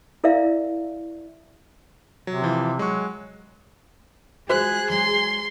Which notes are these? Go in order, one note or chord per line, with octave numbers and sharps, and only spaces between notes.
E4 A#4 D5 E5 F5
C3 F#3
E3 F3 E4
F#3 G#3 C#6
G#3 F4 F#4 G#4 C5 F#6
F#3 G#3 C6